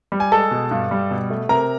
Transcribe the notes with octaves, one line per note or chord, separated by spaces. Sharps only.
G3
G#5
G#3 A4 A5
B2
G2
G3
B2
A3
C3 A#4 A#5